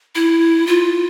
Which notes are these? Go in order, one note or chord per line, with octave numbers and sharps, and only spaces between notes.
E4
F4